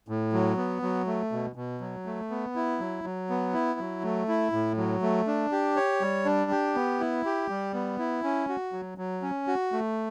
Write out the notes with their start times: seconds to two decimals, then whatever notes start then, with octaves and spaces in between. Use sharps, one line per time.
0.08 A2
0.33 F#3
0.57 B3
0.82 F#3
1.07 A3
1.32 B2
1.56 B2
1.81 F#3
2.06 A3
2.30 B3
2.56 E4
2.80 F#3
3.04 F#3
3.30 B3
3.53 E4
3.79 F#3
4.04 A3
4.28 E4
4.52 A2
4.77 F#3
5.02 A3
5.27 D4
5.52 G4
5.76 C#5
6.01 G3
6.25 D4
6.51 G4
6.75 B3
7.00 E4
7.25 G4
7.50 G3
7.74 B3
7.99 E4
8.24 C#4
8.49 F#4
8.73 F#3
8.98 F#3
9.22 C#4
9.47 F#4
9.72 A3